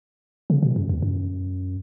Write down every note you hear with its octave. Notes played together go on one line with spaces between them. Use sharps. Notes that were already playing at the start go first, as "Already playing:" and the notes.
C#3
B2
F#2
E2
F#2